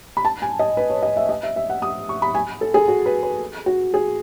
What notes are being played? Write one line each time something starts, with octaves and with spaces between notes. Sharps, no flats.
B5
A5
G#5
D#5
B4
C#5
D#5
E5
D#5
E5
E5
F#5
D#6
C#6
B5
G#5
A4
G#4
F#4
B4
B4
F#4
G#4